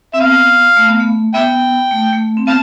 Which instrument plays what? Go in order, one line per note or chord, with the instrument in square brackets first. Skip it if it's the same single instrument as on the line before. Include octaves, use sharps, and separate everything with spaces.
[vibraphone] C4 [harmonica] E5
[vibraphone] B3 [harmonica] F5
[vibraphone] A3
B3
A3
[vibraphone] B3 [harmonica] E5 G5
[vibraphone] A3
A3
C4
[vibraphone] B3 [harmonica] F5 A5